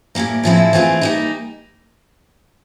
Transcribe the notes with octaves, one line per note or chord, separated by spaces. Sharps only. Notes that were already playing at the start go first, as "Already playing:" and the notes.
A2 E3 G3 A#3
A2 F3 G#3 C4 E4
E3 A3 C4 F4 G#4
G3 A#3 D#4